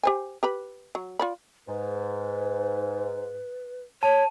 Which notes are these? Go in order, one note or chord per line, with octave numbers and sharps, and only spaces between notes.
G4 C5 G#5
G4 B4 B5
F#3
F4 D5 B5
G#2 B4
C#5 A5